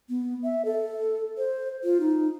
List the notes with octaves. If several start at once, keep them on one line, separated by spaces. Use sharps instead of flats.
B3
E5
A4
C5
F4
D#4